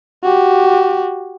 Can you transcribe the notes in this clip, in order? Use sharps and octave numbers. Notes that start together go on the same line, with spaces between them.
F#4 G4